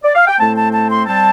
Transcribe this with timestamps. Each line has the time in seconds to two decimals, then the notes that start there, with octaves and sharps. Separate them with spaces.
0.04 D5
0.16 F5
0.28 G5
0.39 A2 A3 C4 A5
0.56 A5
0.73 A5
0.90 C6
1.07 G3 C4 A5